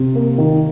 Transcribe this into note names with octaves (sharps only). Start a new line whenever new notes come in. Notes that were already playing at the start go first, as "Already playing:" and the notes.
Already playing: C3
A#3
D#3